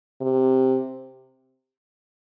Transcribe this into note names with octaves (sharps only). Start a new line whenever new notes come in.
C3